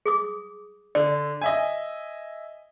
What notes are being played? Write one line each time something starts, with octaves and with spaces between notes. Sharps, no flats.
G#4 D6 D#6
D3 D5
D#5 E5 G#5